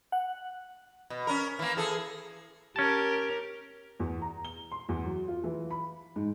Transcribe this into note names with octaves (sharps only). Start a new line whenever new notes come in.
F#5
B2
C#4 A#4
E3 A#3
E3 G#4 A4
C#4 G4 A#4 A5
E2
A#5
G7
C6
E2
F#3
F4
E3
B5
G#2